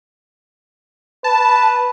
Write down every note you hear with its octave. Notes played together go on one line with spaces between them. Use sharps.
B4 A5